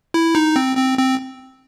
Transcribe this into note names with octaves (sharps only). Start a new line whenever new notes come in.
E4
D#4
C4
C4
C4